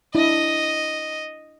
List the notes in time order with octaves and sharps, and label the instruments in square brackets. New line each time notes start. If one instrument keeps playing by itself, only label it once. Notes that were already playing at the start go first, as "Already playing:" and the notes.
[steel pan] D4 E4 [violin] D#5